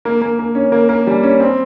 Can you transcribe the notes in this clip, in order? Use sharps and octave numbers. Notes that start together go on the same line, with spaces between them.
A#3
A#3
A#3
C#4
A#3
A#3
G3
C#4
C4